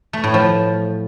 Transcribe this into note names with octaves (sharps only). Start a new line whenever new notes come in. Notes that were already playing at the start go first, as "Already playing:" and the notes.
A3
A2
F3